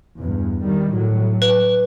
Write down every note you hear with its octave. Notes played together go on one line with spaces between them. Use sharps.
E2 G2
D#3 G3
A2 F#3
B4